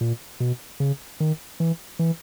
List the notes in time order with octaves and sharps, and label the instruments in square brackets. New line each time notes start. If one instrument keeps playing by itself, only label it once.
[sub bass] A#2
B2
C#3
D#3
E3
E3